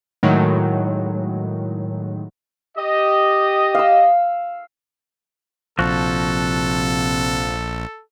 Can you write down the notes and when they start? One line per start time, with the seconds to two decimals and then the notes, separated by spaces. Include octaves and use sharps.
0.23 A2 D#3 F#3 G#3
2.77 G4 D#5
3.75 F5 E6
5.79 A#1 C3 F3 F#4 A4